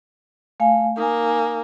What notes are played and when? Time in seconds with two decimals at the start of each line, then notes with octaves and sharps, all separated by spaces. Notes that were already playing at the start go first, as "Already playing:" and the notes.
0.60 A3 F5 G#5
0.97 A#3 D#4 G#5